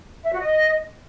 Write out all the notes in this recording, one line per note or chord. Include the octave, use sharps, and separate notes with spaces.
E5
F#4
D#5